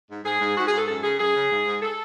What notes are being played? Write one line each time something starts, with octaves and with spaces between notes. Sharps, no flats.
G#2
G#2 G#4
G#2
G#2 F#4
G#4
G#2 A4
F#2 A4
C#3 G#4
F#2 G#4
C#3
G#2
G#2
A4